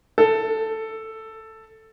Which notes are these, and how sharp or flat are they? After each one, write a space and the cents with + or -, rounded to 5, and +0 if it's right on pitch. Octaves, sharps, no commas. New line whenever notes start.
A4 +5